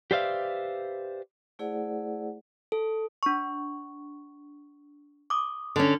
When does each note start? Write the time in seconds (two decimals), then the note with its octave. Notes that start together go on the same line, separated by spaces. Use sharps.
0.11 G4 B4 C5 D5 E5 F5
1.59 A3 E4 G#4 C5 D5 F#5
2.72 A4
3.23 D4 C#6
5.30 D6 D#6
5.76 D3 C#4